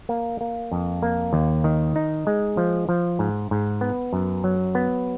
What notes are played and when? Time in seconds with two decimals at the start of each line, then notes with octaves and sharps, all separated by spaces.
0.09 A#3
0.41 A#3
0.72 F2
1.03 A#3
1.33 D#2
1.64 D#3
1.96 D#4
2.27 G#3
2.57 F3
2.89 F3
3.19 G#2
3.51 G#2
3.81 B3
4.13 F#2
4.44 F#3
4.75 B3